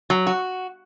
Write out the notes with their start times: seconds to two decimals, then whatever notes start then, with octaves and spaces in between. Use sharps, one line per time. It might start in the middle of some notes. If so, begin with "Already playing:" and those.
0.10 F#3
0.27 F#4